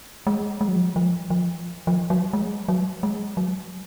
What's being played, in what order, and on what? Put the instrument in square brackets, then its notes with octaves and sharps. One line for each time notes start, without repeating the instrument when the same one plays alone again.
[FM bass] G#3
G#3
F#3
F3
F#3
F3
F3
F3
F#3
G#3
F#3
G#3
F#3